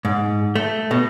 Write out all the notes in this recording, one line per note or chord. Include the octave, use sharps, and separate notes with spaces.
G#2
A3
B2